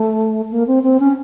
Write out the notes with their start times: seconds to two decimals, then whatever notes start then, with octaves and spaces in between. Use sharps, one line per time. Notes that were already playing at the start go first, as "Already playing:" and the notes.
Already playing: A3
0.51 A#3
0.67 C4
0.83 C4
1.00 C#4